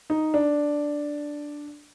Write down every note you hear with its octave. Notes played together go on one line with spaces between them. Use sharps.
D#4
D4